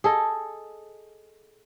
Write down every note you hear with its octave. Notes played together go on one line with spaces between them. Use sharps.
G#4 A4 D#5